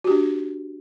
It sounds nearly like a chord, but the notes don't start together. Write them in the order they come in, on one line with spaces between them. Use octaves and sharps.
F#4 G4 D4